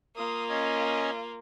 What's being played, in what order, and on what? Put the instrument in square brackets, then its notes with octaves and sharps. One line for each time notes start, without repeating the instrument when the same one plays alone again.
[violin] A#3 F4 [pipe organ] D#6
[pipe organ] C#4 D#5 G#5